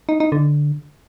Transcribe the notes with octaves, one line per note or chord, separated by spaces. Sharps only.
D#4
D#4
D3